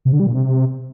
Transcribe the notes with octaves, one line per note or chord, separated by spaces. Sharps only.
C3
D3
G3
A#2
C3